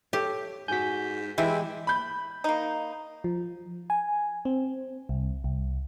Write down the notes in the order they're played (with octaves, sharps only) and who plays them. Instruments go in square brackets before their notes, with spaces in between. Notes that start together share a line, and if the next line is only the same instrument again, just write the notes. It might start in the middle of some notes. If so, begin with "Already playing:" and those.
[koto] G4 [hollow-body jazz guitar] A4 C#5
[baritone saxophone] G#2 [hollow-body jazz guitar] F#4 G#5 [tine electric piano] G6 B6
[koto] E3 [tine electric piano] G#3 E5 G5 [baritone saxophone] E4 [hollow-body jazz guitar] G4
[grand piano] B5 G6
[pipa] A#3 D#4
[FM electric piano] F3
G#5
C4
C2
C2